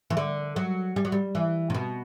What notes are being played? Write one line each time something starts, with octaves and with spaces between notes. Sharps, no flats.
E3
D3
F#3
G3
F#3
G3
E3
C3
B2